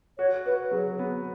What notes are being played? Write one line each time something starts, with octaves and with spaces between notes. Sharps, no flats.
F#4 C#5
F#4 B4
F#3 G#4
B3